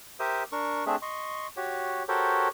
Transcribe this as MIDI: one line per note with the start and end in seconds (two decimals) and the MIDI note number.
0.20 0.43 67
0.20 0.43 70
0.20 0.43 72
0.20 0.43 76
0.20 0.43 87
0.52 0.84 62
0.52 0.84 70
0.52 0.84 85
0.86 0.96 57
0.86 0.96 60
0.86 0.96 62
0.86 0.96 68
0.86 0.96 76
1.02 1.47 75
1.02 1.47 84
1.02 1.47 85
1.57 2.03 66
1.57 2.03 67
1.57 2.03 73
2.08 2.48 66
2.08 2.48 67
2.08 2.48 69
2.08 2.48 70
2.08 2.48 72
2.08 2.48 73